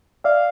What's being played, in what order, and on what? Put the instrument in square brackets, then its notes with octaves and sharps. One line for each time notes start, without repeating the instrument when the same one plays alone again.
[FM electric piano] D5 E5 [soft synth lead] F5